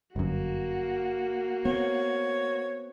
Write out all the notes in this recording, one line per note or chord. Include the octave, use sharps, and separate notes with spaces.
G1 F#2 A#3 F#4
B3 C4 C#5